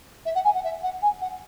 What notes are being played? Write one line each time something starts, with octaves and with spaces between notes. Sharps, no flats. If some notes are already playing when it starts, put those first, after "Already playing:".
E5
F#5
G#5
F#5
E5
F#5
G#5
F#5